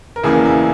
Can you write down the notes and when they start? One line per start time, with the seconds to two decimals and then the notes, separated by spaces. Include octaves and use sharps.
0.16 A#4
0.24 E1 E2 C#3 E3 A#3 G#4
0.45 E4